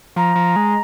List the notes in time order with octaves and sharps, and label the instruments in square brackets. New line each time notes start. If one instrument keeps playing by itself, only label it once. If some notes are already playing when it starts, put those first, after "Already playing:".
[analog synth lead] F3 [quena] A#5
[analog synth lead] F3
G#3